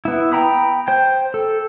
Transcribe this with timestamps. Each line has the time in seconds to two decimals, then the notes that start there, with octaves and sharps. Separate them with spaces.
0.05 B3 E4
0.32 G5 A#5 B5 D#6
0.88 C5 G5
1.34 A4